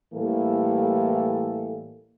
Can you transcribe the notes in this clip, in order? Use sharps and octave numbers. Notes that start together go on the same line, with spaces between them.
A2 E3 G3 A#3 A4